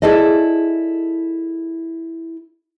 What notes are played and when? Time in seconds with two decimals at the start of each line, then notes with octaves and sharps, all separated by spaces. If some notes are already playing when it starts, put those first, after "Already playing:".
0.02 E4 G#4 A4 D5 D#5